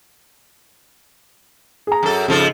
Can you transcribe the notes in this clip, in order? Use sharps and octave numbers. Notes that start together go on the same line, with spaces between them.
G#4 A#5
F#2 A4
G#2 C#3 F3 A4